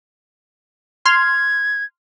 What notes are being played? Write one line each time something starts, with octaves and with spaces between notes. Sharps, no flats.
C6 F6 G#6